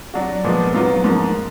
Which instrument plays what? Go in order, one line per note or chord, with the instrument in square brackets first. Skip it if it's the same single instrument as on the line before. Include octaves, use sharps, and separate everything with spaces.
[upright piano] F#3 D4 F#4
A#2 F3 G#3 B3
G#2 F#3 B3 F4
G#2 F3 A#3